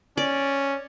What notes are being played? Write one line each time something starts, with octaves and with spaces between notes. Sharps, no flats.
C#4 D5